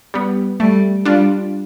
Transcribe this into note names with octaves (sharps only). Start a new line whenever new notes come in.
G3 B3
G3 A3
G3 D4 F4